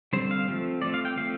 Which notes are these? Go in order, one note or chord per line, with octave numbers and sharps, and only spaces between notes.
D3 G3 C4 C5
F5
F3 A3 C4
F3 A3 C4 D5
F5
G5
F3 A3 C4 F5